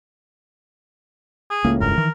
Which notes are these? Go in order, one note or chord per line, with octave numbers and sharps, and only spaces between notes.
G#4
C#2 A2 A#3
F1 G2 A#4
D#3 E3